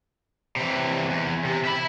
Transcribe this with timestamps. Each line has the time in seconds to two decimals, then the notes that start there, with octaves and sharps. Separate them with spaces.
0.56 C3 E3
1.10 E2
1.44 C3
1.65 E5 B5